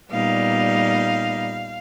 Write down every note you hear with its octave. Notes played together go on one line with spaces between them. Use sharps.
A#2 G3 B3 D#4 F5